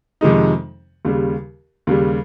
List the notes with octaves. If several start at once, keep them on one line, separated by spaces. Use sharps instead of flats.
F2 C3 D#3 G#3 D#4
D#2 C#3 G3
D#2 C#3 G3